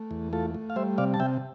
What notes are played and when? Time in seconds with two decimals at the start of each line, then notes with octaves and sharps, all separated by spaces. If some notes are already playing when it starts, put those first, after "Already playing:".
Already playing: A3
0.11 E2
0.33 A3 F4 A4
0.54 A3
0.70 F5
0.76 G3 C5 E5
0.98 C3 D5 F5
1.14 A5
1.20 C3 E5 G5